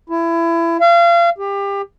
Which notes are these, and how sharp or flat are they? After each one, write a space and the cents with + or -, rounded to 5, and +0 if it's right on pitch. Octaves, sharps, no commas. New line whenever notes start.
E4 +25
F5 -35
G4 +25